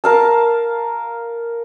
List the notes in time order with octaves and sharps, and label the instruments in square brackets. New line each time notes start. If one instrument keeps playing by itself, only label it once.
[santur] A#4 F5 A5